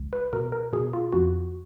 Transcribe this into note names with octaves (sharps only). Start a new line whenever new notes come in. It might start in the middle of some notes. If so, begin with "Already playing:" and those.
Already playing: C#2
B4
B2 A#4
A#4
B2 G#4
F4
F2 F#4